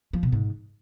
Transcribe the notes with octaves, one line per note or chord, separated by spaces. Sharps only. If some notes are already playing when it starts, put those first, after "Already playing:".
F3
B2
G#2